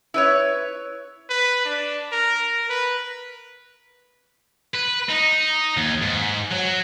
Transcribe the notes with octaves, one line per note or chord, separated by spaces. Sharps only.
E4 B4 C#5
B4
D4
A#4
B4
B4
D#4
D#2
G#2
F#3